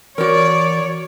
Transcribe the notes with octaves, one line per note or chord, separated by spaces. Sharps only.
E3 F#4 A#4 C#5 D5